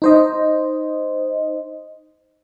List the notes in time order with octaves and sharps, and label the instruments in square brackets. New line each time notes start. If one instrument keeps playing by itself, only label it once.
[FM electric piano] D#4 C5 D#5